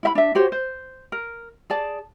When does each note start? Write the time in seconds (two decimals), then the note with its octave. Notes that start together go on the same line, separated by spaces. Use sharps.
0.03 E4 E5 B5
0.15 D4 E5
0.35 F#4 G4 C5 C#5
0.52 C5
1.12 A#4
1.70 G#4 D5 A5